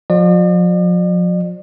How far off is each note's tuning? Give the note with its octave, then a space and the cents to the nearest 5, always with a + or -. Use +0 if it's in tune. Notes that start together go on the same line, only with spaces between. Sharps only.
F3 +40 D5 +45